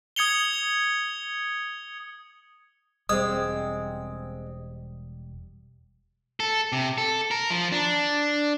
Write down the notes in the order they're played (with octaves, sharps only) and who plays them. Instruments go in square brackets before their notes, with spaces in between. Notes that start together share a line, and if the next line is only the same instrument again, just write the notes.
[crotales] D#6 G#6 C#7 F7 G7
[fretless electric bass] E1 [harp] G3 [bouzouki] G#3 B3 C4 [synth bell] D#6
[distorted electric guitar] A4
C3
A4
A#4
F3
D4